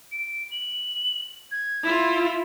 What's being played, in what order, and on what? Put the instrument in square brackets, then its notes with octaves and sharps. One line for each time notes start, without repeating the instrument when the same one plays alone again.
[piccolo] D7
F#7
G#6
[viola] E4 F4